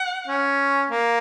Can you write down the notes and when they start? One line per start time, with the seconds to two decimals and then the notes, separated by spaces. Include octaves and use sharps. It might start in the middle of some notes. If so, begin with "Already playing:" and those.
Already playing: F#5
0.27 C#4
0.90 A#3